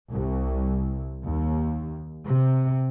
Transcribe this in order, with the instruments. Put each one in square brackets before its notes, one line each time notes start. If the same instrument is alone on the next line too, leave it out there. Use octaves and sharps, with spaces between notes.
[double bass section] C2
D#2
C3